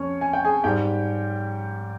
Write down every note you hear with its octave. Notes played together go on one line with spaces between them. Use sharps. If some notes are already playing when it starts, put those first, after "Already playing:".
Already playing: F2 C#4 C#5
G#5
G5
G#4 G#5
G#2 G3 G4 G5